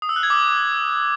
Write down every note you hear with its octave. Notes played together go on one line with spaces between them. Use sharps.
D#6
E6
F#6
G#6
D6